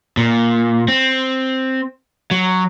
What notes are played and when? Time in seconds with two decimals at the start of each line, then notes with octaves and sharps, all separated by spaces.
0.17 A#2
0.88 C4
2.31 F#3